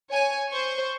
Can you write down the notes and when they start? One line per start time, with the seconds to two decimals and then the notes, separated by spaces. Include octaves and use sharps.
0.11 C#5 G#5
0.49 C5 C#6